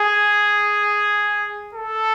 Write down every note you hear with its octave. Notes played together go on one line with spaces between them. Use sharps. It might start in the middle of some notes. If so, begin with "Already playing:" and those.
Already playing: G#4
A4